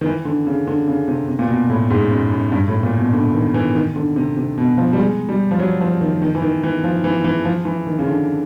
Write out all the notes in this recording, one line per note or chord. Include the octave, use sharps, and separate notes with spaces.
D#3
E3
D3
C#3
D3
C#3
C3
C3
A#2
B2
A2
G#2
F#2
F#2
G2
A2
A#2
B2
D3
D#3
E3
D#3
D3
C3
C3
B2
F3
G3
G#3
G3
F3
F#3
F3
D#3
D#3
E3
D#3
E3
F3
E3
E3
F3
E3
D#3
C#3
D3